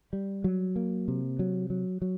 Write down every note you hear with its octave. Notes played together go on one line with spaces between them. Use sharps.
G3
F#3
A#3
C3
F#3
F#3
F#3